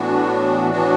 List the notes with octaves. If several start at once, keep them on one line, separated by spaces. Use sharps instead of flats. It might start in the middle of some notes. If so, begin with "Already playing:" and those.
Already playing: A2 E3 B3 D4 F#4
A2 E3 B3 D4 F#4